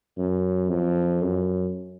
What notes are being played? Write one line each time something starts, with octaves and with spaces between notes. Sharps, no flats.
F#2
F2
F#2